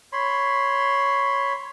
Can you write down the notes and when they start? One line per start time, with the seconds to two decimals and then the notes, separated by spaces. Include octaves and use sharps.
0.13 C#5 B5 C6